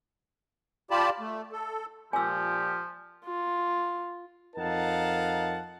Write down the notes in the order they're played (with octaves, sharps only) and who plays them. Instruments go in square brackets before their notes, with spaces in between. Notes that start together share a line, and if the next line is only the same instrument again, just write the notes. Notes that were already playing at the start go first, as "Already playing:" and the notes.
[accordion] F4 G4 D5 A5 B5
A3
A4
[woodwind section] A#2 G4 [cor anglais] F3 [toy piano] G#5 E6
[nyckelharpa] F4
[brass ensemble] F2 D#4 A#4 F5 F#5 A5